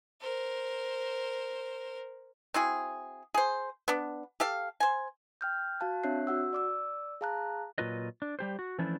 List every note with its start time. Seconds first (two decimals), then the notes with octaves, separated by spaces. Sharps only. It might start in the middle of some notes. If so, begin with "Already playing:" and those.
0.21 A#4 C5
2.54 C4 E4 F#4 G#4
3.34 G#4 C5
3.88 B3 D4
4.40 G4 A4 F5
4.80 C5 G#5
5.41 G5 F6 G6
5.80 F#4 F5 A5 F#6
6.03 C4 D4 C#5 E5 F#6 C7
6.27 F#4 F#5 E6
6.53 D5 D6 E6
7.21 G#4 F5 A5 A#5 F#6
7.78 A#2 F#3 F4 B4 D#5
8.22 D4
8.39 G3 G4 C5
8.59 F#4
8.78 E3 F3 A3 C#4 D4 E4